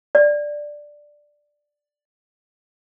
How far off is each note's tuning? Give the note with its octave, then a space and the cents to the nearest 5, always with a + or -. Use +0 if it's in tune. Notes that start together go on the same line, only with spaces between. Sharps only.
D5 +5